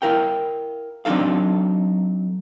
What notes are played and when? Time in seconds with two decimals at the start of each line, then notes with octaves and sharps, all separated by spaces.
0.02 E4 A#4 F5 G5
1.05 F#3 C4 D4 D#4 A4 F5